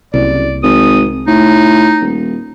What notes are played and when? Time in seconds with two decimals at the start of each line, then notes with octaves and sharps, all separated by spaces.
0.14 F#1 C2 D5
0.63 G#1 D#6
1.27 A2 D#4
2.01 D#1